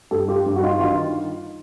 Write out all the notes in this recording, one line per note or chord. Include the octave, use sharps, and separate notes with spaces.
G2 G4 A4
F4 G4
G2
F#4
D#4 F4
D#3 D#4 F4